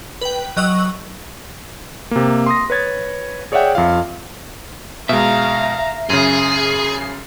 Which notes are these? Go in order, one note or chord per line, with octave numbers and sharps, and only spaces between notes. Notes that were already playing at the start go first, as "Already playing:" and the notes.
B4 G5
F#3 D#5 C#6 E6 F#7
C3 A#3
C6 D#6 A#6
B4 C#5 G#6 A6
G#4 C#5 D5 E5 F#5 G5
F2 F4 F5
B2 G#3 E5 F5 A#5
F#2 C#3 G#4 C7